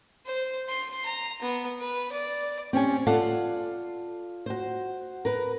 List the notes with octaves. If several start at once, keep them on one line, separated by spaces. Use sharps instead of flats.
C5
C6
A#5
B3
B4
D5
C4 C#4 G4 G#5
F4 A4 D5 F5 F#5
F#4 C5
A#4 B4